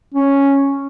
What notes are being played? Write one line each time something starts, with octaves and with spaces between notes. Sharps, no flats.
C#4